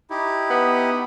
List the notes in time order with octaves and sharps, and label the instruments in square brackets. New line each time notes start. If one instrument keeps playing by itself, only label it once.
[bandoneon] D#4 E4 G4
[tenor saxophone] B3